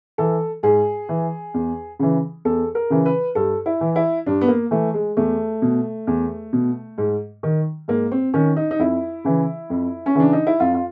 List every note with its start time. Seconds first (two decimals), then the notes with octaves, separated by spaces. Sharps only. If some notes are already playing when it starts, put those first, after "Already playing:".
0.18 E3 A4
0.63 G#2 G#4
1.09 E3
1.54 E2
1.99 C#3 E3
2.45 E2 A4
2.75 A#4
2.90 C#3 E3
3.06 B4
3.35 G2 A4
3.66 E4
3.81 E3
3.96 E4
4.26 G2 D4
4.41 B3
4.48 A#3
4.71 E3 A3
4.94 G#3
5.17 E2 A3
5.62 B2
6.07 E2
6.53 B2
6.98 G#2
7.43 D#3
7.88 G#2 A#3
8.11 C4
8.34 D#3 C#4
8.56 D#4
8.71 D#4
8.79 F2 E4
9.25 C#3 E3
9.70 F2
10.06 C#4
10.15 C#3 E3 D4
10.33 D#4
10.47 E4
10.60 F2 F4
10.74 F4